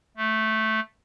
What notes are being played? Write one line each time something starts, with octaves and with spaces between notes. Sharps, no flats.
A3